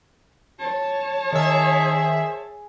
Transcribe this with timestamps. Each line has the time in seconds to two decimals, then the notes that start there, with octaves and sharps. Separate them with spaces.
0.60 C#5 A5
1.33 D#3 G#4 E5